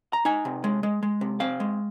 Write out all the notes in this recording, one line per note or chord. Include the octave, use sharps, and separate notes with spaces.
A#5
D#4 G#5
C3
G#3
G#3
G#3
C3
C4 F5
G#3